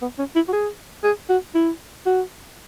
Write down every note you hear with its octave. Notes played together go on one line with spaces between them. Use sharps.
B3
C#4
E4
F#4
G#4
G#4
F#4
E4
F#4